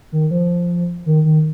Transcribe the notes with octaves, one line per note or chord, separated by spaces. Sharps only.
D#3
F3
D#3
D#3